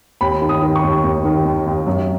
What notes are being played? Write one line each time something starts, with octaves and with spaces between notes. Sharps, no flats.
D#2 B5
D#3
D#6
D#3
C#6
D#2
D#2
D#3
D#2
D#2
F#2